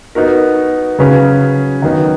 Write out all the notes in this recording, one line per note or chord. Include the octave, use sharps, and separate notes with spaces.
B3 D#4 F#4 A#4
C#3 F#3 C#4 G#4 B4
D#3 F#3 B3 D#4